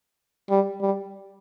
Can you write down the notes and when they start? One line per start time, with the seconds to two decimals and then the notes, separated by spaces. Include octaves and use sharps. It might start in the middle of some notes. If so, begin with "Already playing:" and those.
0.50 G3
0.81 G3